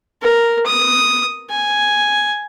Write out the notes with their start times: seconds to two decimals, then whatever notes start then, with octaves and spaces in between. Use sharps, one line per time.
0.22 A#4
0.66 D#6
1.50 G#5